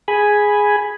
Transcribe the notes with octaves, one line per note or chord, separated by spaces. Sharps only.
G#4 G#5 B5